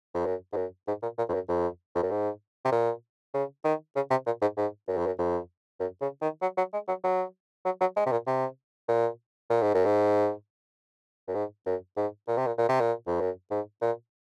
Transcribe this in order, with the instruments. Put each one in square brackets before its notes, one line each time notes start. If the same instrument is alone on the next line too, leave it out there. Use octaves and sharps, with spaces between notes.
[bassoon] F2
F#2
G#2
F#2
G#2
A#2
A#2
F2
F#2
F2
F2
F#2
G#2
C3
A#2
C#3
D#3
C#3
C3
A#2
G#2
G#2
F#2
F2
F#2
F2
F#2
C#3
D#3
F#3
F#3
G#3
F#3
F#3
F#3
F#3
G#3
C3
A#2
C3
A#2
A#2
G#2
F#2
G#2
F#2
G#2
F#2
G#2
A#2
C3
A#2
A#2
C3
A#2
F2
F#2
G#2
A#2